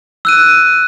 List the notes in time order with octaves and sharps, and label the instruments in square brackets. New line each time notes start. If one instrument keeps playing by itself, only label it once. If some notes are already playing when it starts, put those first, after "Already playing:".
[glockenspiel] E6 F#6 D#7